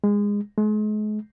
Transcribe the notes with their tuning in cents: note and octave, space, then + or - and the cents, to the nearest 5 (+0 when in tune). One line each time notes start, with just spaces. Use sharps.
G#3 -20
G#3 +40